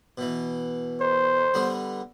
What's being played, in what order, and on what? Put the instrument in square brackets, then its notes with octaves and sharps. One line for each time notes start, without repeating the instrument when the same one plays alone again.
[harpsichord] B2 E3
[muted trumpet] C5
[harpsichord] D3 G3 B3